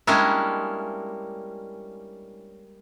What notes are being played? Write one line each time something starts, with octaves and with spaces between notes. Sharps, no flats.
G3 G#3 A#3 C#4 D4 E4